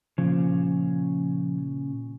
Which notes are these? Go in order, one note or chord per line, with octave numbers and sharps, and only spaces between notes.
A#2 C#3 F3